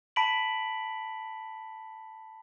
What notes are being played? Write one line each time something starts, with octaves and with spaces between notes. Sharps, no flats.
A5 B5 B6 D7 F#7